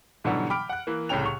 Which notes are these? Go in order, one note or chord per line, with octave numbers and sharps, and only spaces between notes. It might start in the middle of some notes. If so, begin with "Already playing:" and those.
G#2 B2 D3 E3 F#3 G3
G5 B5 D6 F6 D7
F#5 F#6
E3 A#3
C2 A2 C#3 C#5 G5 F7
C#6